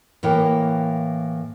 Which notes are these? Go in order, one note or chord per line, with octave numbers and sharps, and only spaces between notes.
A2 E3 A#3 A#4 G5